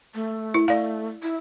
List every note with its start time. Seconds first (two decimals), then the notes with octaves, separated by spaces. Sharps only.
0.15 A3
0.54 E4
0.68 A3 D5 F5
1.23 E4